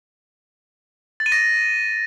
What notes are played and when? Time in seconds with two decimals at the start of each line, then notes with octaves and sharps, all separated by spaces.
1.20 A6
1.26 D#7
1.32 A#6